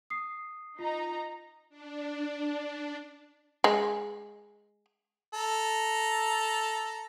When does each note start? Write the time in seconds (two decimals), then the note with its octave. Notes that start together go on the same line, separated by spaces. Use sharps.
0.10 D#6 C7
0.79 D#4 F4 A#5
1.70 D4
3.64 G#3
5.34 A4 A#5